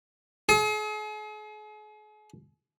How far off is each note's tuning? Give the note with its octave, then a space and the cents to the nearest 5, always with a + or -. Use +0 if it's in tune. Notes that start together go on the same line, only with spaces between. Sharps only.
G#4 +40